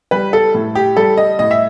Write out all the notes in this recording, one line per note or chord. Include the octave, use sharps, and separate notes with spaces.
G3 B4
A4
A2
G4
G3 A4
D#5
A2 D#5
E5